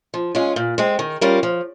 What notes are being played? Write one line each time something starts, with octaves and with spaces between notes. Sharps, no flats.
F3
G#3 C#4 F4
A#2
G#3 C4
D#3
G3 C#4 F4 A#4
F3